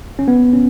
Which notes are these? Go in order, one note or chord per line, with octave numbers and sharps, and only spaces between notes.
C#4
B3
C#4